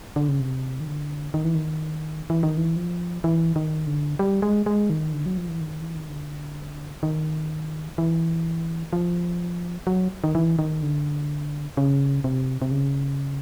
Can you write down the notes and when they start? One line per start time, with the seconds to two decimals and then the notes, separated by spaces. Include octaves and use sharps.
0.16 D3
0.29 C#3
0.40 C3
0.80 D#3
0.87 D3
1.34 D#3
1.44 E3
1.55 D#3
2.30 E3
2.43 D#3
2.57 E3
2.76 F3
3.24 E3
3.56 D#3
3.87 D3
4.19 G3
4.42 G#3
4.66 G#3
4.90 D#3
5.13 D3
5.26 F#3
5.37 F3
5.49 E3
5.61 D#3
5.81 E3
5.95 D#3
6.08 D3
7.03 D#3
7.98 E3
8.93 F3
9.87 F#3
10.24 D#3
10.35 E3
10.59 D#3
10.83 D3
11.77 C#3
12.24 C3
12.62 C3
12.71 C#3